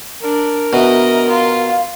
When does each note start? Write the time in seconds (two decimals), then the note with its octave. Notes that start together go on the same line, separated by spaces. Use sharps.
0.23 D4 A#4
0.73 B2 D#5 E5
1.29 F4 F5